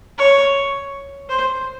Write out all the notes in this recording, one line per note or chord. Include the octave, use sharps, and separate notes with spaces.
C#5
C5